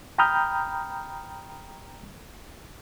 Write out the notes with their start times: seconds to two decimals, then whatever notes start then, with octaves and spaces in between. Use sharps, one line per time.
0.18 G5 A#5 B5 D#6 F6 G6